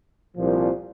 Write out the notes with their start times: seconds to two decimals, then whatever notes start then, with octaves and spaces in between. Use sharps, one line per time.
0.36 C2 A#2 F3